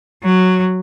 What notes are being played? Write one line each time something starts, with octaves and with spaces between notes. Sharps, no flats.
F#3